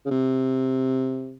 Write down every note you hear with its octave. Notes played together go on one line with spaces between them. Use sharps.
C#3
C3